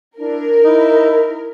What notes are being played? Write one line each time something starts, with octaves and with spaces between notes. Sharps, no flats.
D4 E4 A#4
D#4 E4 B5